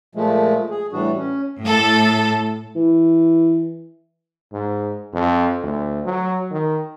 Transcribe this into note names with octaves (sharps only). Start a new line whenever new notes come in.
A#2 F3 G#3 A3
G#4
A2 E3 G3 D4 F#4
C#4
A2 A4
E3
G#2
F2
D2
F#3
D#3